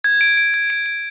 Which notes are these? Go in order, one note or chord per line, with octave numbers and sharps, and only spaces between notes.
G#6
D7
D7
G#6
D7
D7